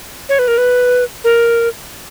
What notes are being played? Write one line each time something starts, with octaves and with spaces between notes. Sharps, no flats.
C#5
B4
A#4
B4
A#4